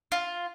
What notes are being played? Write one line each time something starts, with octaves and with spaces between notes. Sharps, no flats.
F4